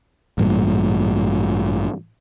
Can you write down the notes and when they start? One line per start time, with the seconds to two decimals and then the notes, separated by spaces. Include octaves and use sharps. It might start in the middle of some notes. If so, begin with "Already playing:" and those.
0.38 A1 G2 A#2